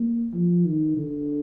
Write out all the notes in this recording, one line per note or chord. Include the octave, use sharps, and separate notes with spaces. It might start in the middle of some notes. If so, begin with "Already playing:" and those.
Already playing: A#3
F3
D#3
D3